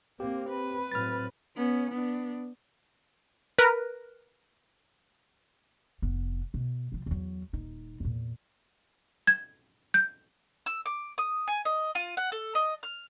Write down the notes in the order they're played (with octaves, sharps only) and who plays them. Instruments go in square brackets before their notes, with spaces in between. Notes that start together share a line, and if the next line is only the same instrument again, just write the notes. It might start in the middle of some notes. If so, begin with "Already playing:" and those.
[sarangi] A#3 [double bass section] C4 [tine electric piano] G4
[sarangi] B4
[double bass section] A2 F#3 C4 [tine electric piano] F6 A6
[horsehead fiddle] B3 C#4
B3 D4
[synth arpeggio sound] A#4 B4
[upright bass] F1 B3
B2
C3 F3
E2 F#3
D#1 D#4
E2 A#2
[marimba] G#6
G6
[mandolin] E6
D6
D#6
G#5
D#5
F4
F#5
A4
D#5
F6